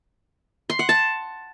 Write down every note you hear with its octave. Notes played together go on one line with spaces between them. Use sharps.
C6
F#5
A5